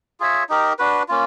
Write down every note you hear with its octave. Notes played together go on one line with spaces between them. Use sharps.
F4 G#4 C#5 E5
D#4 G4 A#4
D4 F#4 B4
A#3 C#4 F4